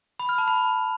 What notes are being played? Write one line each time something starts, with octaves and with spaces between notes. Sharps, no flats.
B5
F6
A5
B5